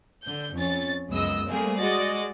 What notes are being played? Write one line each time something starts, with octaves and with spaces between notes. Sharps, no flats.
D3 G6
F2 C#4 A6
C#2 F#2 G#3 B3 D#5 E6
G3 A3 A#3 C4 G#4
G#3 F#4 D5 D#5 A6